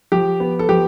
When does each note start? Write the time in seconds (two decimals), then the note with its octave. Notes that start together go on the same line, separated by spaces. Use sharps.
0.12 F3 G4
0.40 B3
0.59 A4
0.69 F3 G4